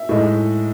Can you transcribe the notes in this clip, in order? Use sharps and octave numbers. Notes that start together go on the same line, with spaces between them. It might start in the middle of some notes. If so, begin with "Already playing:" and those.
Already playing: E5
A2 G#3 D#4